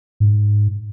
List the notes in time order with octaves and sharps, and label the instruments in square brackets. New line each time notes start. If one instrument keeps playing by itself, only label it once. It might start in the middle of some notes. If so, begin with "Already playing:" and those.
[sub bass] G#2